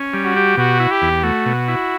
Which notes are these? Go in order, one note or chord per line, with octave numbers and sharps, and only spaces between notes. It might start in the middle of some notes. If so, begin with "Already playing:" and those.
Already playing: C#4
G3
F#4
G4
B2 F#4
E4
G4
E2
A3 F#4
B2
E4